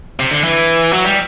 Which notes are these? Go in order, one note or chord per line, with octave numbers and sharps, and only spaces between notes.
C3
D3
E3
F#3
G3